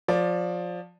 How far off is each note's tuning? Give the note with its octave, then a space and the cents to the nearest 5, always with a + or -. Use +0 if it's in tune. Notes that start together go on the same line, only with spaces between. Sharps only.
F3 +20 D5 +0